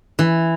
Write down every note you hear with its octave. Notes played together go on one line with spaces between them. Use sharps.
E3